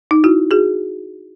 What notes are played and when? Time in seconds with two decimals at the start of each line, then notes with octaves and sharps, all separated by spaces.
0.11 D#4
0.24 E4 F#4
0.51 F#4 G#4